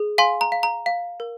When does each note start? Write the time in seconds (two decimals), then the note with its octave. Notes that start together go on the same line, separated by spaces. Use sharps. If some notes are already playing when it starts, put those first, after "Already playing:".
Already playing: G#4
0.18 F5 G#5 C6
0.41 A#5
0.52 F5
0.63 A#5
0.86 F5
1.20 A#4